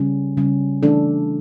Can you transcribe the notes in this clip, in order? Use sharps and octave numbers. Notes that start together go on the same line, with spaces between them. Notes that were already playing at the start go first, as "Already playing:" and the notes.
Already playing: C#3 G3 C#4
C#3 G3 C#4
E3 A3 D4 A4